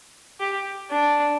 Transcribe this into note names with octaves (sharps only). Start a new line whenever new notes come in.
G4
D4